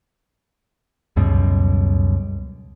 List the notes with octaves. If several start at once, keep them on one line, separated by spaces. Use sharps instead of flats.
C#2 F#2 B2 G3